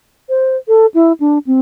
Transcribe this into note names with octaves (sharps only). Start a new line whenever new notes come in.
C5
A4
E4
D4
C4